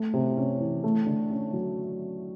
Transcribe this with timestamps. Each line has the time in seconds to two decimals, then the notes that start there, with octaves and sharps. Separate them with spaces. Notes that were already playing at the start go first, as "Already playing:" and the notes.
Already playing: A3
0.13 C3
0.37 C#4
0.60 E3
0.84 A3
1.07 D3
1.31 C#4
1.53 F#3